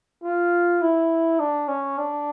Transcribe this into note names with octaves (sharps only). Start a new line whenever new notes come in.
F4
E4
D4
C#4
D4